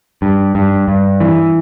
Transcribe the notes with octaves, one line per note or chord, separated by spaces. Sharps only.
G2
G2
G2
E3